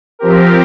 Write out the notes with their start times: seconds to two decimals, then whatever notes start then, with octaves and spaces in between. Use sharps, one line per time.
0.19 F3 C4 G4 A#4